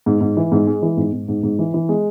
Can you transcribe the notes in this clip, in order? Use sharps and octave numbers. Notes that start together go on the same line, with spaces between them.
G#2
G#2
E3
G#2
G#3
E3
G#2
G#2
G#2
G#2
E3
E3
G#3